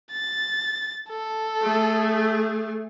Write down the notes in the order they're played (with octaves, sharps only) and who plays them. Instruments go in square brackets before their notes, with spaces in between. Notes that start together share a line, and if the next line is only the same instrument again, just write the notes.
[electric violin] A6
A4
[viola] A3 G#4